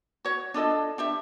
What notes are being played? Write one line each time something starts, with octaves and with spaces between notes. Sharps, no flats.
F#4 C#5
D4 F4 A4 D#5
D4 G4 E5